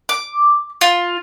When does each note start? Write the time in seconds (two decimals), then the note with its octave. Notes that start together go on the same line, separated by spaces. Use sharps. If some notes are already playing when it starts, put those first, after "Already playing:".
0.09 D6
0.81 F4